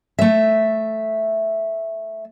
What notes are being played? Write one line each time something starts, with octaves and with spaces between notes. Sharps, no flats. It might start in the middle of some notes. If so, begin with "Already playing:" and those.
A3 E5